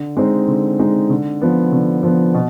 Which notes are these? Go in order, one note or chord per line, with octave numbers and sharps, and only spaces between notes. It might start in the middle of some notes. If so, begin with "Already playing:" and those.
Already playing: D3
G#3 C4 D#4
D3
G#3 C4 D#4
D3
F3 B3
D3
F3 B3
B2